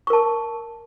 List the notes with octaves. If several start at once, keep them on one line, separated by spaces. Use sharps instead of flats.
A#4 A5 C#6